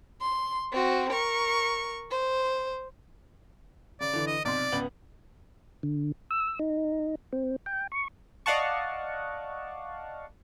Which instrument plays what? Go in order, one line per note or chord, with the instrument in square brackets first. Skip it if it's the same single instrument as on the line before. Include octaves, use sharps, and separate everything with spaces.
[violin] C6
C4 F#4
A#4 C#6
C5
[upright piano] C#3 [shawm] D5
[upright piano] D3 E3
[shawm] D#5
[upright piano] B1 C3 C6 [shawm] D5
[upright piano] C#2 B3 F#7
[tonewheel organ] D3
E6
D#4
C4
G5
C#6
[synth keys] D5 D#5 F5 F#5 A5 C#6